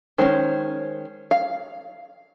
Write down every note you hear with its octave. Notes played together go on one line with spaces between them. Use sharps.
D#3 G#3 C#4 C5
F5